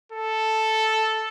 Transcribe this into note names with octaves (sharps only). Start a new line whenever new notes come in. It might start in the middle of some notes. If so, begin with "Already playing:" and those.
A4